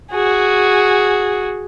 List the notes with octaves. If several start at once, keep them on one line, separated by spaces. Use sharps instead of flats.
F#4 G#4